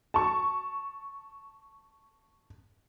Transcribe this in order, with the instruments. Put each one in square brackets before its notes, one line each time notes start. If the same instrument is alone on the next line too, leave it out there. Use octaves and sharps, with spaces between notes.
[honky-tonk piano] A5 C#6